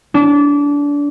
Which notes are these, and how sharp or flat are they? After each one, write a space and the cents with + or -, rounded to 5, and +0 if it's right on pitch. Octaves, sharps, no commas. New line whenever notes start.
D4 -25